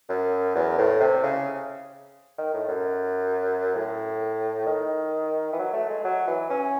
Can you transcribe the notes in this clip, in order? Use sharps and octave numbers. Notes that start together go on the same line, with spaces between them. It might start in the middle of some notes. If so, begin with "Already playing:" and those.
F#2
E2
A2
C3
C#3
D#3
A2
F#2
A2
D#3
E3
F#3
A3
G#3
F#3
E3
C#4